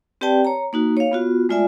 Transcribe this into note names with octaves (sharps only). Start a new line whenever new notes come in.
C4 G4 B4 D5 G5 A5
C#5 A#5
A#3 D#4 F#4
C#5 F5
B3 F4 F#4
G#3 A3 F4 D5 E5 G#5